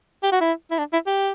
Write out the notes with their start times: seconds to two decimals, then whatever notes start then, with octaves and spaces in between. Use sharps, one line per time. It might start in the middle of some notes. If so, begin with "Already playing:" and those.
0.23 G4
0.32 F#4
0.41 E4
0.71 E4
0.79 D4
0.93 E4
1.07 G4